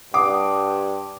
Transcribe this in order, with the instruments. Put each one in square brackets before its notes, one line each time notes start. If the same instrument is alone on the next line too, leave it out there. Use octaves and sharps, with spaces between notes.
[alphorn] G2 [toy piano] F#5 D#6 [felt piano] D6